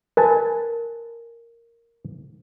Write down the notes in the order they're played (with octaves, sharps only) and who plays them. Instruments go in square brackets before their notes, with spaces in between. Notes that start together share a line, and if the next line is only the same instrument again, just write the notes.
[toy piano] A#4 [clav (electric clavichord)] B4 G#5 A5